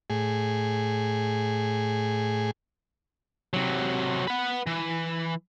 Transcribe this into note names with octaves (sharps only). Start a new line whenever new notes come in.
A2 G#4
C3 F#3
B4 F#5
E3